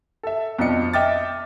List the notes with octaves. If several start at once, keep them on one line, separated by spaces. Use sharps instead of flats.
A4 E5
F2 B2 F3 D4 D#5 C#7
D#5 E5 G5 D6 F6 A6